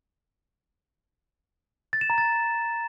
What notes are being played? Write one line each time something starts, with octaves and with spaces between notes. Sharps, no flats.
A6
E7
A#5
A6